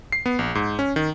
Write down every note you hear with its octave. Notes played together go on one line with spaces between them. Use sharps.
C7
B3
A#1
G#2
C#4
D#3